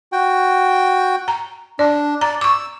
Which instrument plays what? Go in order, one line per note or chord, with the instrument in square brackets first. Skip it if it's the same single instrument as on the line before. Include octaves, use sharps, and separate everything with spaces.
[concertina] F#4 G5
[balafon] A#5
[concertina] D4 [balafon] D5
[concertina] D5 [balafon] A#5
[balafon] C#6 D6 [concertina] E6